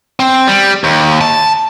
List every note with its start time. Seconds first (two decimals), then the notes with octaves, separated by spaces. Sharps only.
0.20 C4
0.47 G3
0.84 D#2
1.21 A5